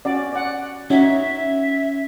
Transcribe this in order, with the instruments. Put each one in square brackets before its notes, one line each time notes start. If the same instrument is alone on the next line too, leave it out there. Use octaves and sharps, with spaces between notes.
[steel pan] C#4 F#4 D5
D5 F#5
[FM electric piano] C#4 [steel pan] D#4 F#4 [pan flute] E5